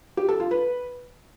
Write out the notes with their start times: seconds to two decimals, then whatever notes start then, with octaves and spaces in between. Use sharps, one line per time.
0.17 G4
0.29 A4
0.40 F4
0.51 B4